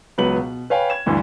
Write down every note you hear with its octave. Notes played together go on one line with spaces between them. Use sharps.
C#2 F#3 B3 B4 F#7
B2
B4 C#5 F5 G5 G#5 B5
G#6 E7
D2 G2 D3 E3